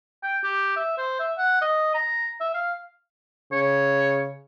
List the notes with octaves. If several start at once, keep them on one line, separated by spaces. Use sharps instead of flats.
G5
G4
E5
C5
E5
F#5
D#5
A#5
E5
F5
C#3 C#5